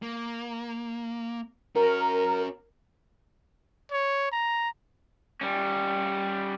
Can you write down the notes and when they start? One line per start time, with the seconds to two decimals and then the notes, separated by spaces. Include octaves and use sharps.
0.02 A#3
1.76 C#4 F#4 A#4
3.91 C#5
4.31 A#5
5.41 G3 C#4